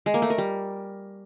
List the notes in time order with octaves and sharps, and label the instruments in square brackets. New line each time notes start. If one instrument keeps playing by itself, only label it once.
[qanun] G#3
A#3
A3
A#4
G3